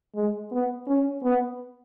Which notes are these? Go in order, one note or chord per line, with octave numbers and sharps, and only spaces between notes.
G#3
B3
C#4
B3